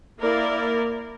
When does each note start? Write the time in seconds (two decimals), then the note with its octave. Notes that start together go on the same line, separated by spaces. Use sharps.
0.19 A#3 E4 A#4 D5